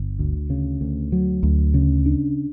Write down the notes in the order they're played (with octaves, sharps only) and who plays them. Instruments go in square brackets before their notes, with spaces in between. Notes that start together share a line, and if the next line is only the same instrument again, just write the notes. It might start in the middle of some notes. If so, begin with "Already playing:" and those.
Already playing: [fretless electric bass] G1
D2
C#3
D2
F#3
D2
C#3
D4